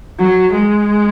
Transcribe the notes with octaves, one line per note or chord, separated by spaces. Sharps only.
F#3
G#3